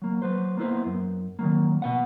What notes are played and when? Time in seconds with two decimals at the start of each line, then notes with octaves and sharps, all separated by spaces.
0.02 F#3 A#3
0.22 F#3 B4 C5
0.57 A#3 B3 E4 C5
0.86 F#2
1.39 D#3 F3 F#3 A#3
1.82 B2 B3 F#5